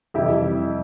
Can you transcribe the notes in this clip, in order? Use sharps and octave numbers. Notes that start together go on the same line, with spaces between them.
F2 C3 E3 G3 E4 G4